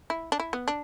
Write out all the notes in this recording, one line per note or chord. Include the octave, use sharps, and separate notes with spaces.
E4
D4
E4
B3
D4